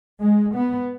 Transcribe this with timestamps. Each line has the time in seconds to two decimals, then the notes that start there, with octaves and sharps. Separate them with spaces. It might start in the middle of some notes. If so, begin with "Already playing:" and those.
0.22 G#3
0.54 B3